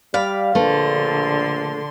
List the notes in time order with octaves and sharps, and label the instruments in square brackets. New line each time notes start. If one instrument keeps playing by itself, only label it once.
[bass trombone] G3 [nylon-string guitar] D5 [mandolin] F5 B5
[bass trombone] A#1 [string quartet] D3 C6 [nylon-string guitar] A3 B4